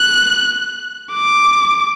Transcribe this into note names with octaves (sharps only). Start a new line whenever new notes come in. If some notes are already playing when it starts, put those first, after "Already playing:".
Already playing: F#6
D6